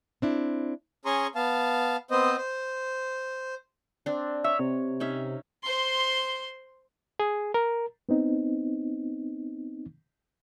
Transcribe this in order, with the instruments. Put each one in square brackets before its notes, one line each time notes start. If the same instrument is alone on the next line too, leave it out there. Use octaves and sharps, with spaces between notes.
[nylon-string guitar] C4 D4 E4
[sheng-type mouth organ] C#4 G#4 G#5 A#5 C6 C#6
B3 F5 A5
B3 C4 C5 D#5
C5
[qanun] C4 D4
[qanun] C#5 [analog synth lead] E5
[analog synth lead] C3
[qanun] C#4 D#4 E5
[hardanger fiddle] C5 C6
[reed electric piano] G#4
A#4
B3 C4 D#4